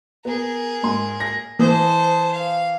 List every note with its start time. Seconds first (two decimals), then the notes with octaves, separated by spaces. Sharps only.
0.25 B3 G#4 A#4
0.83 G#2 C6
1.20 A#6
1.59 E3 C5 A5 D#6
2.31 F5